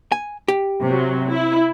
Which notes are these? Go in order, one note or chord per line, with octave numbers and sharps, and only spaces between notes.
G#5
G4
C3 F#3
E4